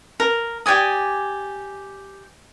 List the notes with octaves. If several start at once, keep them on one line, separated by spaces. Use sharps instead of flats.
A#4
G4 D5 G#5 D#6